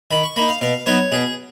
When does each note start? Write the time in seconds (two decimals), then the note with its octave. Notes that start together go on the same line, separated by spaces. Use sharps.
0.11 D#3 B5
0.23 C#6
0.36 A#3 D#4 B5
0.48 F5
0.61 B2 F5
0.86 F#3 B3 D#4 C#5
1.12 B2 G#4